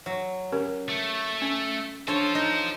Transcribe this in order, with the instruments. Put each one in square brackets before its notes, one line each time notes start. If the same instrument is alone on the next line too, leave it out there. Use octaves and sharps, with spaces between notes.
[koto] F#3
[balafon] C#4 G4 A#4
[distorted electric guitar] A3
[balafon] C#4
[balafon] D4 [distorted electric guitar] F4 C5 [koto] A4 C#5
[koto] D#4